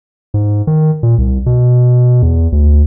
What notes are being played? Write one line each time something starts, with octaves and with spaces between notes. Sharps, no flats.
G#2
D#3
A#2
C2
B2
E2
D2